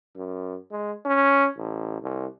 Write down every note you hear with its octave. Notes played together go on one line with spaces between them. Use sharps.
F#2
G#3
C#4
A1
C2